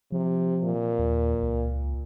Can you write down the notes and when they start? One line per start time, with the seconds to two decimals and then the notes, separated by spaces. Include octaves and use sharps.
0.12 C3 F3
0.64 A#2
0.99 D#2
1.42 C#2